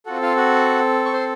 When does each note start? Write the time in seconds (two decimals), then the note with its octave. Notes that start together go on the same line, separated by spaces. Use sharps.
0.06 C4 F4 F#4 A4 F#5
0.22 F4 F5
0.36 F#4 F#5
1.06 C#6
1.13 C5 C6